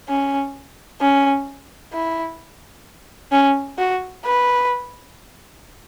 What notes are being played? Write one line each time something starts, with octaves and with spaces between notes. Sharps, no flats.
C#4
C#4
E4
C#4
F#4
B4